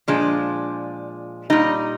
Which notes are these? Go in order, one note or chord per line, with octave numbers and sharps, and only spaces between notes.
A#2 F3 G#3 D4
A#2 G3 D#4